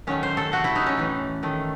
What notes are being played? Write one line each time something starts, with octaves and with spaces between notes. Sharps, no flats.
D#3 F#3 A3 C#4
C5
A4
C3 F#3 A3 F#4
E4
D#4
C#4
A2 E3 A3
D#3 A3